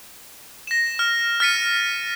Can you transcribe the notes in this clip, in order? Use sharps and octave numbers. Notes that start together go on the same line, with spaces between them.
A#6 E7
F6
F6 A6 B6 C#7 D#7